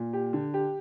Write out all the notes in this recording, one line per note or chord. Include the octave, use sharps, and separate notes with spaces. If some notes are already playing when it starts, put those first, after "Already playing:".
Already playing: A#2
G4
D3
G4